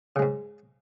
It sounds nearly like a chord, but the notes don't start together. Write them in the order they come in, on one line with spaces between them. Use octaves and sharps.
C#3 G#3 G#2